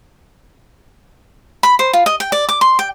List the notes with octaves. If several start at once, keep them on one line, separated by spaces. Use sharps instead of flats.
B5
C5
F4
D#5
G5
D5
D6
C6
G5